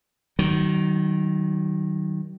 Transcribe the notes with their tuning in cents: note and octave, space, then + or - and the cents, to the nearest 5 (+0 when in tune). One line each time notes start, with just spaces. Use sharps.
D#3 +0 F#3 +35